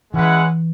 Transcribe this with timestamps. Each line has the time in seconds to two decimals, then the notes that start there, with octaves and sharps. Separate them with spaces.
0.14 E3 G#3 C#4 E4 B4 F#5